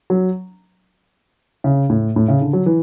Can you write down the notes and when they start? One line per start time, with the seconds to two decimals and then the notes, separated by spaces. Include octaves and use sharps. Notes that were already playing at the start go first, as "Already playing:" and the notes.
0.10 F#3
1.64 C#3
1.90 A2
2.16 A2
2.28 C#3
2.41 D3
2.53 F#3
2.66 E3